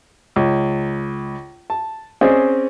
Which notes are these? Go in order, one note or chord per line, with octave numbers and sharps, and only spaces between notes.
C#2
A5
C4 C#4 G#4 C5 D5 D#5